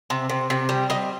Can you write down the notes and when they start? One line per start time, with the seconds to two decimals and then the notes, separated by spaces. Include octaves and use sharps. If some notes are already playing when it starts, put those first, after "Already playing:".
0.10 C3
0.30 C3
0.50 C3
0.69 G3
0.90 G3 D#5